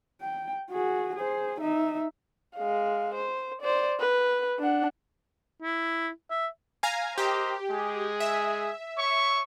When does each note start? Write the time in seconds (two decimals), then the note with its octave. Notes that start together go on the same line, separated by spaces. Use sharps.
0.21 G5
0.70 F#4 G#4
1.16 G#4 C5
1.60 D#4 E5
2.56 G#3 F5
3.14 C5
3.62 C5 D5
3.99 B4
4.59 D4 F#5
5.62 E4
6.30 E5
6.83 F5 G#5 A#5
7.18 G4 A#4 C5 D#5
7.70 G#3 G#4
8.20 E5
8.98 C#5 C#6